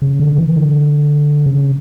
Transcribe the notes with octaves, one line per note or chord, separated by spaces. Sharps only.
C#3
D3
E3
D3
C#3